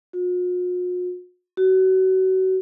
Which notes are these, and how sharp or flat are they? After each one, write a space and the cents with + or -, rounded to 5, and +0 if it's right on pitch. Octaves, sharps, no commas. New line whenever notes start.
F#4 -45
F#4 +30